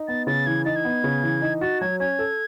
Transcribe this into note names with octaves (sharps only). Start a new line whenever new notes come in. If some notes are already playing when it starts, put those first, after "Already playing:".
Already playing: D#4
B3 A6
C#3 A6
E3 G#6
D#4 A6
G#6
B3
C#3
E3
D#4
F#4 A6
F#3 G#6
C#4 G#6
A4